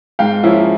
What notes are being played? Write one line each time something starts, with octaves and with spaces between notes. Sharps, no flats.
G#2 F5 G5
F3 A#3 C#4 E4